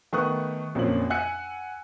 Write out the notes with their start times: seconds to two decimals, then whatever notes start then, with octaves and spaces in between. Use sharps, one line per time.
0.13 D#3 A3 B3 C#6 D#6 F#6
0.75 A#1 F2 F#3 A#3 C#4 F#7
1.10 F#5 G#5 E6 F#6 C#7